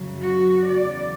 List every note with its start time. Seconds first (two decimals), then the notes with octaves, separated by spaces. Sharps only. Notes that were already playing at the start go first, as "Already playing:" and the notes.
Already playing: F#2 C#3 F#3
0.22 F#4
0.65 E2 C#3 F#3 D5